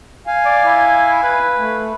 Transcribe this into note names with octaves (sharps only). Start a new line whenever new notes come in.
F5 G#5
D5
E4
B4
A3